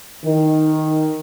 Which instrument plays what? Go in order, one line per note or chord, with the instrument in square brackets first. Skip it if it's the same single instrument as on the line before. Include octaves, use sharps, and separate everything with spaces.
[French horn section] D#3